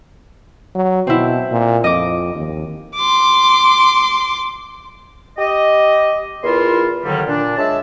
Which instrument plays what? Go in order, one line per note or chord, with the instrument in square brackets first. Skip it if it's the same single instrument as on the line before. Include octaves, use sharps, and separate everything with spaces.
[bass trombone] F#3
[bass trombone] B2 [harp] C4 E4
[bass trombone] A#2
[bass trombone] F2 [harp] D#5 D6
[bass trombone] D#2
[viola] C6 D6
[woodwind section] G4 D#5
E2 E4 F4 A#4 C6
D#2 D3 D#3 F#3 G3
A#2 D4
G#3 C#5 E5 A5